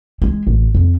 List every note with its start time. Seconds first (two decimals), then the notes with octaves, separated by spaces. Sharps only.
0.22 G#3
0.47 A1
0.75 F2